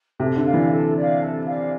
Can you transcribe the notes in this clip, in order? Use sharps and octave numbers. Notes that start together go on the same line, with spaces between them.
C3 A4
D3
D5 F5
E3
A4
D5 F5
A4
D5 F5